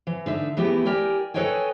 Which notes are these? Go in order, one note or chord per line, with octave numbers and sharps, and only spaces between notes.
E3
D3 D#4 E5
E3 A3 B3 E4 G4 G#4
G4 A#4 D5 G5 G#5
A4 B4 C#5 D#5 G5 G#5